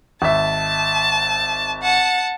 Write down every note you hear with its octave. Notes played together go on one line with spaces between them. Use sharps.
G#1 E5 A5
F#5 A5